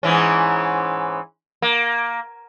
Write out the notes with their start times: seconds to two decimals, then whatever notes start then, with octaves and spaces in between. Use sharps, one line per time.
0.03 G#2 E3 C#4
1.62 A#3